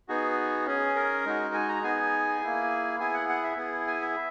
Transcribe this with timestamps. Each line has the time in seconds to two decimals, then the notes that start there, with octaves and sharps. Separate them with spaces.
0.09 B3 D#4 F#4 G#4
0.66 C#4 G#4
0.95 A#4
1.25 G#3 D#4 F#4
1.54 G#5
1.69 A#5
1.83 B3 D#4 G#4 G#5
2.41 A#3 E4 G#4
2.99 B3 E4 G#4 G#5
3.14 F#5
3.29 F#5
3.43 E5
3.57 B3 E4 G#4
3.87 G#5
4.01 E5